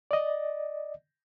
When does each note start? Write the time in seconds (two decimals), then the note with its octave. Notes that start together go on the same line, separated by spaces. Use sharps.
0.11 D5 D#5